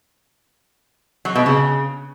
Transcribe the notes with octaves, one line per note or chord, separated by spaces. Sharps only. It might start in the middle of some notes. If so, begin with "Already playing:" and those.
F#3
B2
C#3